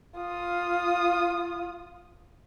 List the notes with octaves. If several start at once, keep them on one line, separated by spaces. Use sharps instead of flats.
F4 D#6